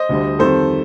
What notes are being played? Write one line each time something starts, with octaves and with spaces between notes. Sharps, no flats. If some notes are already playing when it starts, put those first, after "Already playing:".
Already playing: C5 D#5
D2 D3 G3
F2 D#3 G3 A4 C5